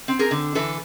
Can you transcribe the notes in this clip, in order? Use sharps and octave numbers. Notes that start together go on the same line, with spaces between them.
C4
G#4 A#4
D3
E3 A4 B4